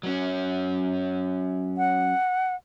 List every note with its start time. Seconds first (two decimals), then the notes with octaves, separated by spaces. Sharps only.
0.03 F#3 C#4
1.77 F#5